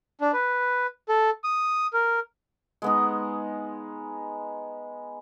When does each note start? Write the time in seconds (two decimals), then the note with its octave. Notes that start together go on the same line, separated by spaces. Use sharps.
0.21 D4
0.33 B4
1.09 A4
1.44 D#6
1.94 A#4
2.82 G#3 B3 D#4